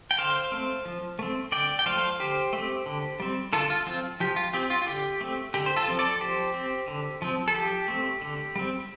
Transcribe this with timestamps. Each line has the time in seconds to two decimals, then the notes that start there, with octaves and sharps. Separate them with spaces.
0.11 G5
0.18 D3 C5 F5
0.52 A3 C4
0.85 F3
1.19 A3 C4
1.52 D3 D5 G5
1.79 G5
1.86 F3 A3 C5 F5
2.19 D3 G4 C5
2.53 A3 C4
2.86 D3
3.20 G3 C4
3.53 D3 F4 A4
3.70 F4
3.87 F3 C4 F4
4.20 F3 G4
4.36 F4
4.53 C4 G4
4.70 F4
4.82 F4
4.87 D3 G4
5.21 A3 C4
5.54 D3 G4
5.66 C5
5.76 F4 A4
5.88 F3 C4
5.99 A4 D5
6.21 F3 G4 C5
6.54 C4
6.88 D3
7.22 F3 C4
7.48 A4
7.55 F3 G4
7.88 A3 C4
8.21 D3
8.56 G3 C4